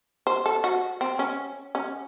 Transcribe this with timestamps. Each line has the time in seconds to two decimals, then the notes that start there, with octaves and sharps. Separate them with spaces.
0.27 C5
0.46 A4
0.64 F#4
1.01 C4
1.19 C#4
1.75 C#4